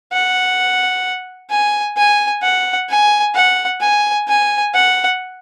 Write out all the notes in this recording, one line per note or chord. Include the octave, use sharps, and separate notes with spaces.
F#5
G#5
G#5
F#5
G#5
F#5
G#5
G#5
F#5